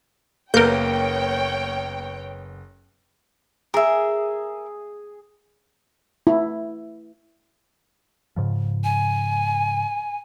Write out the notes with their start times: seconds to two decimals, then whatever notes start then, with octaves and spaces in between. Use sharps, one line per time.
0.54 F#1 A#3 B3 A#4 C#5 G5 G6 D7
3.74 G#4 A#4 E5
6.27 E4
8.36 G#2 C#3 F3
8.84 G#5